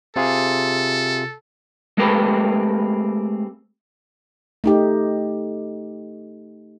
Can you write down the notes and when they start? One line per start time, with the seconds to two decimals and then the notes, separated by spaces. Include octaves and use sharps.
0.16 C3 F4 G#4 A4
1.98 G#3 A3 C4 G4 A#4 B4
4.64 A3 D#4 G4